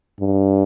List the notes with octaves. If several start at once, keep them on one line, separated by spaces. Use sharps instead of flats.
G2